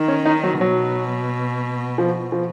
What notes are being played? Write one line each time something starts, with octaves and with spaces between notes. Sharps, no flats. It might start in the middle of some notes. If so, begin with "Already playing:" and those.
Already playing: D#3
C#4
D#4
F#3
B2 F#3
F3
F3